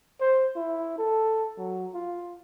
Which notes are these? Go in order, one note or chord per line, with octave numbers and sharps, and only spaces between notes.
C5
E4
A4
F#3
F4